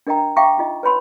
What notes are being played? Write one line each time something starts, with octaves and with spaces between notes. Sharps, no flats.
D4 A#4 D#5 G5 A#5
E5 F5 G5 A#5 C#6 D6
D#4 F4 D#5
B4 C#5 B5 C6